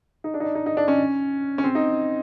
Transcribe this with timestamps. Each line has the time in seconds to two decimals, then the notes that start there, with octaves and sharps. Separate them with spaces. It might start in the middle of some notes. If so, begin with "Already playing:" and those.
0.24 D#4
0.34 D4
0.40 D#4
0.44 D4
0.55 D#4
0.66 D#4
0.77 D4
0.88 C#4
1.58 C#4
1.64 C4
1.75 D#4